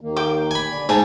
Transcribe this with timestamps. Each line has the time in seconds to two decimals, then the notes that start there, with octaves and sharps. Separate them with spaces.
0.01 D#2 D#3 A#3
0.16 G5 D6
0.51 G#5 B5
0.72 D3 D5
0.89 G#2 F5 G#5 A5